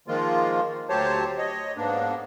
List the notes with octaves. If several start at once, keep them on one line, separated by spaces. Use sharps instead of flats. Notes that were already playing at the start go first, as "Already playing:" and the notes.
D#3 F3 G#3 A#3 F4
D2 F#3 G4 C5 C#5 A5
C#5 D#5
G#2 A#3 B3 D4